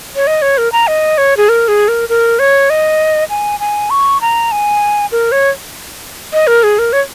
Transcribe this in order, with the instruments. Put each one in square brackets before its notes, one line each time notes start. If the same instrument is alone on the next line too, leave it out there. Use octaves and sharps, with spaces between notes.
[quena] C#5
D#5
C#5
A#4
A#5
D#5
C#5
G#4
A#4
G#4
A#4
A#4
C#5
D#5
G#5
G#5
C#6
A#5
G#5
A#4
C#5
D#5
A#4
G#4
A#4
C#5